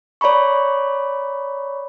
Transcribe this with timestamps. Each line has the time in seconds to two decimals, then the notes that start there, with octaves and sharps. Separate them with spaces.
0.21 C#5 D5 A#5 B5 C#6